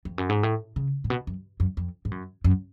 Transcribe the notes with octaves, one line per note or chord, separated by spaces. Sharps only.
F2
F#2
G#2
A2
C#3
A2
B2
F#2
F#2
F2
G#2
F#2
F#2